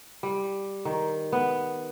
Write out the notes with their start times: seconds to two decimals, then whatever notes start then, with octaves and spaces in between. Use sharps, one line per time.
0.23 G3
0.85 D#3
1.32 B3